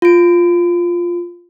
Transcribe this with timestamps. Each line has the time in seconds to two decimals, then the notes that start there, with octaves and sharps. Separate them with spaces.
0.02 F4 D7